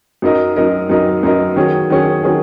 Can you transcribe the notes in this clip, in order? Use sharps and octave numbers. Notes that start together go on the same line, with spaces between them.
F#2 F#3 D#4 A#4 D#5
F#2 F#3 D#4 A#4 D#5
F#2 F#3 D#4 A#4 D#5
F#2 F#3 D#4 A#4 D#5
D#3 F#3 C#4 G#4
D#3 F#3 C#4 G#4
D#3 F#3 C#4 G#4